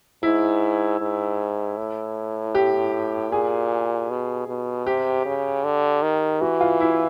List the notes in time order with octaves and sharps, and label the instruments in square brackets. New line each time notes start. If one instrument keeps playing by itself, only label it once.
[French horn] G#2 [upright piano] E4
[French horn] G#2
A2
[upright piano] G4
[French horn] A#2 [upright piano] G#4
[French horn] B2
B2
[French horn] C3 [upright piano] G4
[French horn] C#3
D3
D#3
[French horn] E3 [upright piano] F#4
[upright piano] F4
E4